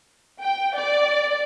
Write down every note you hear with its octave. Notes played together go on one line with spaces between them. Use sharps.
G5
D5